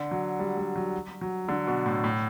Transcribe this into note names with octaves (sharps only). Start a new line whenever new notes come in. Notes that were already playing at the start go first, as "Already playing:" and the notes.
Already playing: D3
F#3
G3
G3
F#3
F#3
D3
B2
A2
A2